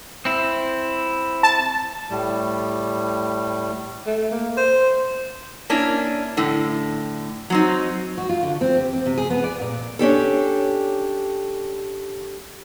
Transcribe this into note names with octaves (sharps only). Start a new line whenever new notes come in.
C4 E4
A5
A2 G3
A3
A#3
C5
A#3 C#4 D4 E4
A2 D3
F#3 C4 D#4
F#4
F4
D3
C4
G4
C4
C3
G#4
B3
D5
A#2
C#4 D4 G4 A4